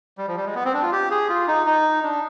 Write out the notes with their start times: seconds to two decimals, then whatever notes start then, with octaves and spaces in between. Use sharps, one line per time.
0.18 G3
0.28 F3
0.37 G3
0.46 G#3
0.55 B3
0.65 C4
0.74 D4
0.83 F4
0.92 G4
1.11 G#4
1.29 F4
1.48 D#4
1.66 D#4
2.03 D4